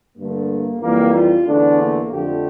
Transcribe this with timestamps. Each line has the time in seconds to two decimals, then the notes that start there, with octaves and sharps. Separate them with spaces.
0.17 G2 D3 A3 A#3
0.81 F2 E3 G3 A#3
1.14 F4
1.46 E2 D3 A3 D4
1.79 A#3
2.11 F2 D3 F3 A3 G4